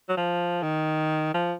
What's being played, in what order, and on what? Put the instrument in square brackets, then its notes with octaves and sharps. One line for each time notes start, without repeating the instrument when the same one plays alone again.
[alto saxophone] F#3
F3
D#3
F3